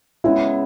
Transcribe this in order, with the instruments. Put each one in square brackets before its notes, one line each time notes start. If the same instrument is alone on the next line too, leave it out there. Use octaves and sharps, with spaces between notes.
[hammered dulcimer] C#3 G#3 B3 [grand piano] E4